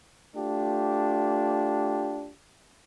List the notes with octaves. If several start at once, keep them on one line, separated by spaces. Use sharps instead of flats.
A3 D4 F4 G4